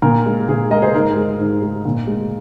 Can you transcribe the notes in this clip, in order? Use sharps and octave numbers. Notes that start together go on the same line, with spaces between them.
A#2 A#4
G#3
A#2 G#4
G#3 A#4 D#5
G#4 C5
G#2 A#4
G#3
G#2
G#3
A#2
G#3